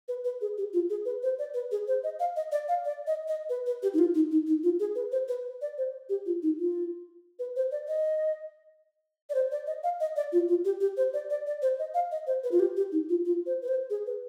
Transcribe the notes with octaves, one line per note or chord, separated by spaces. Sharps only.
B4
B4
G#4
G4
F4
G#4
B4
C5
D5
B4
G#4
C5
D#5
F5
D#5
D5
F5
D5
D#5
D#5
B4
B4
G4
D#4
F4
D#4
D#4
D#4
F4
G#4
B4
C5
B4
D5
C5
G4
F4
D#4
F4
B4
C5
D5
D#5
D5
C5
D5
D#5
F5
D#5
D5
F4
F4
G4
G4
C5
D5
D5
D5
C5
D#5
F5
D#5
C5
B4
F4
G4
G4
D#4
F4
F4
C5
B4
C5
G#4
B4